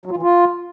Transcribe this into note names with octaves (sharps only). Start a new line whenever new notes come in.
F#3
F4
E3
F4